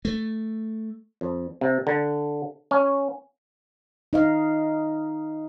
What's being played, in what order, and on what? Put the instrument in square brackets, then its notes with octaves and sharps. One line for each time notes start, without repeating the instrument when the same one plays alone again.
[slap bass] A3
[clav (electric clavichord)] F2
C3
D3
C#4
[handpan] D#4 D#5 F5